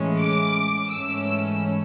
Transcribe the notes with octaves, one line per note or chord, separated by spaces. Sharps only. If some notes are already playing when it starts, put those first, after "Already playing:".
Already playing: A2 E3 G#3 C#4
D6
G#2 E3 A3 C#4 E6